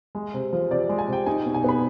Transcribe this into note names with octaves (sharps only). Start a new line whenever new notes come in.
G#3
C3
F3
C3 D5
G#3
G#5
C3 G5
D#4 G#5
B2
G#5
B3 B5